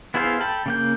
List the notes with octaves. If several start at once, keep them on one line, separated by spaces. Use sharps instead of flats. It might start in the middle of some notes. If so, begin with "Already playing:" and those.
B3 E4 G#4 C5 F5
A4 G5 A5 B5
C#3 A#3 G6